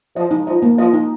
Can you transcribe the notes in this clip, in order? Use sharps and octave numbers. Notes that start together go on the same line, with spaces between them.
F3 D#5
D#4
F3 D#5
A#3
F3 D#5
D#4